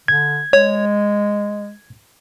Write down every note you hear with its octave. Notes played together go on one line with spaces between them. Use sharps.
D3 G#6
G#3 C#5